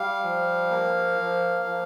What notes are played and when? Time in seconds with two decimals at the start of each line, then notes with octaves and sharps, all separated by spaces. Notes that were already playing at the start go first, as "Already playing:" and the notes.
Already playing: G3 F5
0.23 F3
0.71 A#3
1.19 F3
1.65 F3